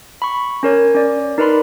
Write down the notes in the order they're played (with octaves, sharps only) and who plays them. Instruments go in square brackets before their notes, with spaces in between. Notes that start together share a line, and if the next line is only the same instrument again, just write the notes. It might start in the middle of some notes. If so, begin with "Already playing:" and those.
[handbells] B5 C#6
C#4 A#4 C#5
C#4 D5
D#4 A#4 B4 D5 B5 C6